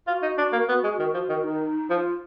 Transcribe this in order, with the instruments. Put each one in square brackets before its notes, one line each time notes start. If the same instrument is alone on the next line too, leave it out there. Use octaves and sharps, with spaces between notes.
[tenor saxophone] F4 [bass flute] F#4
[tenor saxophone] D#4
D4
A#3
B3
G#3
D#3
F3
D#3
[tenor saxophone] D#3 [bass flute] D#4
[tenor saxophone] F3 [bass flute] F4